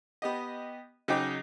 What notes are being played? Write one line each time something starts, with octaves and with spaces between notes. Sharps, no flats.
B3 G4 D#5
C#3 F#3 D#4 G5 D6